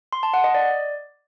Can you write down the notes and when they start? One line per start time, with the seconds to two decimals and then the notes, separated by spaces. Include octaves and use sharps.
0.13 C6
0.23 A5
0.34 F#5
0.44 D#5
0.55 D5